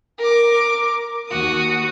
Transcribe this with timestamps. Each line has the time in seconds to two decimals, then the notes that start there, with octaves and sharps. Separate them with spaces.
0.18 A#4 D6
1.29 D#2 F#4 D#6